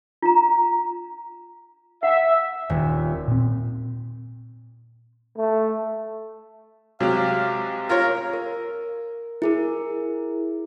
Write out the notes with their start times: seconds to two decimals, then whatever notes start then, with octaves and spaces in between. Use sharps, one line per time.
0.22 F4 A#5
2.03 E5 F#5 G5
2.70 D#1
3.28 A#2 C4
5.37 A3
7.00 C3 F#3 G#3 G4 F5
7.89 F4 A#4 C#5
8.33 A#4
9.42 E4 G#4 A#4